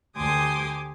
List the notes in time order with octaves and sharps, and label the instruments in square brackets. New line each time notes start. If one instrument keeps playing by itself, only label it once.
[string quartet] D2 G4 G#5 C6 D6 D#6